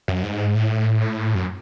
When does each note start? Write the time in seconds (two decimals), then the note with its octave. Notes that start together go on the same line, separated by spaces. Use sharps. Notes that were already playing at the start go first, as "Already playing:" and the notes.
0.08 F#2
0.23 G#2
0.55 A2
1.35 F#2